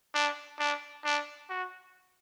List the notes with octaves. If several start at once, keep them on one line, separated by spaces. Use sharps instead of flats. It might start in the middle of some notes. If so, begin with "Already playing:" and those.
D4
D4
D4
F#4